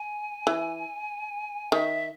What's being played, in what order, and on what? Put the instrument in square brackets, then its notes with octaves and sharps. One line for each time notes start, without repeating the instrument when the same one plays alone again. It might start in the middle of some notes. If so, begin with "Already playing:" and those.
Already playing: [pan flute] G#5
[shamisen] E3
[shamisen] D#3 [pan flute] E5